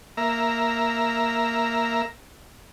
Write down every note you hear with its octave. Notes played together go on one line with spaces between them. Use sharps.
A#3 E5 A#5